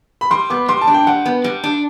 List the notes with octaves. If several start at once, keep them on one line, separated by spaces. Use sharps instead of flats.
B5
G3 C6
B3 D6
G3 C6
A5
D4
G5
G3 F#5
B3
G3
D4